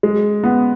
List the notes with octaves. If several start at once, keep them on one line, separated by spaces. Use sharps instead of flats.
G#3
B3